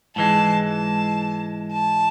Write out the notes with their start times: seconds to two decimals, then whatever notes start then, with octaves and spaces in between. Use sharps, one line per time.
0.16 G#2 E3 G#3 A5
0.68 A5
1.72 A5